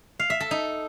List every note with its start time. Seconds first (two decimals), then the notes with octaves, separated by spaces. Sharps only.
0.19 F5
0.30 E5
0.40 A4
0.51 D#4